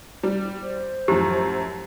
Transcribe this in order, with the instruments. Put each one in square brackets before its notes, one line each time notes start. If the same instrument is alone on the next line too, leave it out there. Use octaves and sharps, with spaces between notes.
[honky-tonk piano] G3
[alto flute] C5
[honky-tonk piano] F#2 A2 F3 [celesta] G4